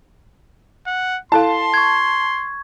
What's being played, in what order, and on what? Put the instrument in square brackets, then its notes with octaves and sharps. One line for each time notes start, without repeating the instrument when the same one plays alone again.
[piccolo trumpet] F#5
[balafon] E4 A4 F5 [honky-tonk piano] A5 [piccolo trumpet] C6
[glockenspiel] C#6 G#6